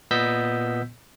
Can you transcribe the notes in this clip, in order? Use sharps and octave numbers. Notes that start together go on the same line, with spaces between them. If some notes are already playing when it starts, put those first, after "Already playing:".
A#2 B3 D#5 E6 G6 B6